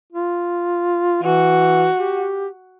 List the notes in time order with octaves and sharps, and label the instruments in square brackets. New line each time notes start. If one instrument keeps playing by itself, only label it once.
[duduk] F4
[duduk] E3 [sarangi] F#4
[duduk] G4